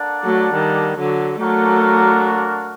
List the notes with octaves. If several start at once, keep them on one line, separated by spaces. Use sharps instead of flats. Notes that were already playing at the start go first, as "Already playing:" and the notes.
Already playing: A#3 D4 A4 D5 F#5
F#3 A3
D#3 G3
D3 F#3
F#3 A3 A#3 D4 F#4 A#4